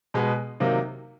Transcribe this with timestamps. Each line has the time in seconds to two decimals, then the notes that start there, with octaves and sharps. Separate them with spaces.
0.14 B2 G#3 B3
0.60 C3 D#3 F#3 A#3 D#4